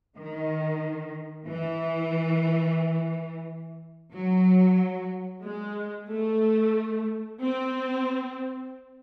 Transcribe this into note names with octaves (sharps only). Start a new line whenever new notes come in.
D#3
E3
F#3
G#3
A3
C4